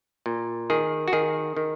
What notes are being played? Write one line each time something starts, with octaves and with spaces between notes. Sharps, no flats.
A#2
D#3 G#4
F#4
D#3 G#4
D#3